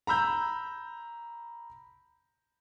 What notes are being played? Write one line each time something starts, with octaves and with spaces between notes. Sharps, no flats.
A#5 B5 E6 G6